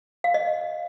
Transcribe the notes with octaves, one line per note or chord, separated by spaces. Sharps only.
F5
D#5